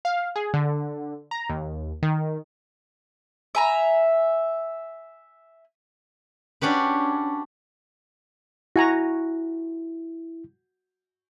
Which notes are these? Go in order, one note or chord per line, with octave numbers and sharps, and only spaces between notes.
F5
G#4
D3
A#5
D#2
D#3
E5 G#5 A#5
C#4 D4 F#4 G4 B4
E4 F#4 G#5 A#5